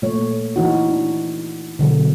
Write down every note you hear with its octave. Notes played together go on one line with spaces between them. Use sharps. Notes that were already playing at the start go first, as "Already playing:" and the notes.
A#2 A3 C#5
E3 D#4 F#4
D4
B2 D3 F#3